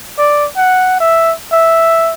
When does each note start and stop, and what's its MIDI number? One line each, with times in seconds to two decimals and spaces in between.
0.18 0.46 74
0.57 0.99 78
1.00 1.33 76
1.53 2.13 76